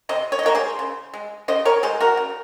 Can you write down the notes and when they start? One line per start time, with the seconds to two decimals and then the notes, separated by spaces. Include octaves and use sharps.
0.09 C3 C5 D#5
0.32 C#5
0.39 D#5
0.43 F3 A#3 A#4 C#5
0.55 G#4 C5
0.79 C#3
1.14 G#3
1.48 C#3 C5 D#5
1.65 A#4 C#5
1.83 G#3 G#4 C5
2.00 F#4 A#4
2.17 C#3